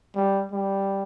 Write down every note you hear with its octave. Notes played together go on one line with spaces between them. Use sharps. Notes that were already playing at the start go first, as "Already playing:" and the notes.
G3
G3